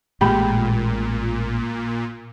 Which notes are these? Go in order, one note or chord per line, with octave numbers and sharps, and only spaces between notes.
A1 A#2 G#3 G4 B5